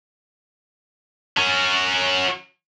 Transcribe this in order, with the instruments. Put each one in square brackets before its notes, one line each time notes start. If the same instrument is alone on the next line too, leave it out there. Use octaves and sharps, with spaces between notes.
[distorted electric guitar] F#3 C#4